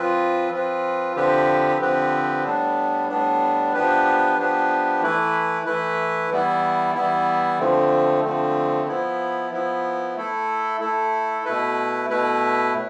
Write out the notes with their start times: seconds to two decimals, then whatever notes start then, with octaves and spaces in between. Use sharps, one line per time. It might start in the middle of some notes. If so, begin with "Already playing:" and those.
Already playing: F3 C4 F4 B4
0.51 F3 C4 F4 B4
1.16 D3 F3 C4 G4 B4
1.80 D3 F3 C4 G4 B4
2.44 A2 G3 B3 D4
3.09 A2 G3 B3 D4
3.73 F3 B3 D4 G4 B4
4.38 F3 B3 D4 G4 B4
5.02 E3 A3 E4 B4
5.66 E3 A3 E4 B4
6.31 E3 G3 B3 E4
6.95 E3 G3 B3 E4
7.59 D3 F3 A3 C4
8.24 D3 F3 A3 C4
8.88 F3 B3 E4
9.52 F3 B3 E4
10.17 A3 E4 A4
10.81 A3 E4 A4
11.45 B2 A3 E4 B4
12.09 B2 A3 E4 B4
12.74 A2